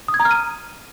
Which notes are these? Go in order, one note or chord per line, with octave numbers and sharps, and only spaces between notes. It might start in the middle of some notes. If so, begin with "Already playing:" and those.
D#6
G#6
A#5
F6
D#7